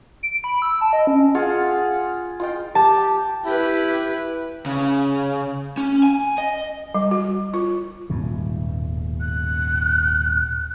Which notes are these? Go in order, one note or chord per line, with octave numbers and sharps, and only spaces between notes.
D7
B5
E6
A5
D#5
C#4
F4 G#4 F5 F#5
F4 D#5 G5
G4 A5
E4 G4 B4
C#3
C#4
G#5
D#5
G3
F#4
F4
D#1 G#2 B2
F#6